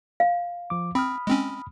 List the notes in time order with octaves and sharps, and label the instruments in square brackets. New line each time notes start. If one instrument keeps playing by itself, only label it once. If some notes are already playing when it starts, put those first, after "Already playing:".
[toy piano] F5
[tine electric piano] F3 D6
[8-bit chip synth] C4 [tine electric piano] B5 D#6 F6
[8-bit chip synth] G#3 C4 C#4